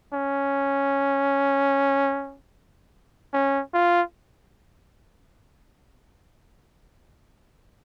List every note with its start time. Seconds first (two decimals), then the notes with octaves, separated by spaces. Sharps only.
0.13 C#4
3.33 C#4
3.74 F4